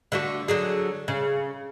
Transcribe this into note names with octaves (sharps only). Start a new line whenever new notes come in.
D3 A3 F#4
D3 F#3 G#4
C#3